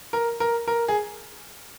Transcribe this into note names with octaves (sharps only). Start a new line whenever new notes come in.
A#4
A#4
A#4
G#4